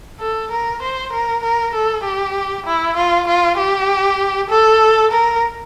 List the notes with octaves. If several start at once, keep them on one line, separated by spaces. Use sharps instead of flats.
A4
A#4
C5
A#4
A#4
A4
G4
E4
F4
F4
G4
A4
A#4